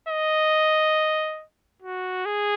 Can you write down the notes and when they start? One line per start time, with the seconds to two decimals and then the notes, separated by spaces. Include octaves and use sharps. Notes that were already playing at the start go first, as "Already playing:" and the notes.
0.09 D#5
1.82 F#4
2.25 G#4